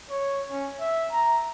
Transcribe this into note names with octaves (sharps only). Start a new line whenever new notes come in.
C#5
C#4
E5
A#5